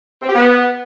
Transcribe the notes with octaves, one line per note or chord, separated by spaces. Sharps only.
C4
G4
B3